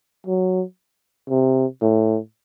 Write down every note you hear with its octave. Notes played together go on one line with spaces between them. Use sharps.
F#3
C3
A2